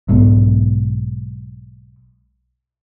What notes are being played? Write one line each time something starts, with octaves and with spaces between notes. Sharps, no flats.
B1 G#2 B2